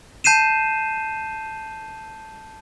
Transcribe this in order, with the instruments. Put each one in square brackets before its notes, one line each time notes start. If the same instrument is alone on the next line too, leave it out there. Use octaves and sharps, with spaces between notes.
[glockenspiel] A5 G6 C7 D#7 E7